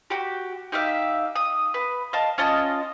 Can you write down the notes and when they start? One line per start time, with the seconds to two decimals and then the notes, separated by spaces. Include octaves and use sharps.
0.10 F#4 G4
0.72 D#4 G4 E5 F5
1.35 D#6
1.74 B4
2.13 D#5 F5 A5
2.38 C#4 F4 D#5 A5